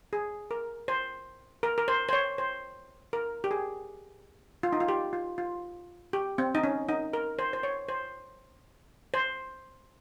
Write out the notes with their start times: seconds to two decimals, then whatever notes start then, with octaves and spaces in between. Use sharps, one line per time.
0.13 G#4
0.51 A#4
0.88 C5
1.63 A#4
1.78 A#4
1.88 C5
2.09 C5
2.13 C#5
2.38 C5
3.13 A#4
3.44 G4
3.51 G#4
4.63 F4
4.73 D#4
4.80 F4
4.89 G4
5.13 F4
5.38 F4
6.13 G4
6.38 C4
6.55 D#4
6.64 C#4
6.89 D#4
7.13 A#4
7.39 C5
7.53 C5
7.63 C#5
7.89 C5
9.14 C5